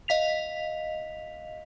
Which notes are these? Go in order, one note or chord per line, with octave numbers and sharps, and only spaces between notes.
D#5 F5 B6 F7